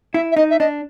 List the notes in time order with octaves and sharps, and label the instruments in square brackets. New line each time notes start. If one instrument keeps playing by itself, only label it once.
[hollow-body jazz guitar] E4 [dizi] E5
[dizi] E5
[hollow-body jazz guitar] D#4 [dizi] D#5
[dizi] E5
[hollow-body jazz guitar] D4 [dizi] D#5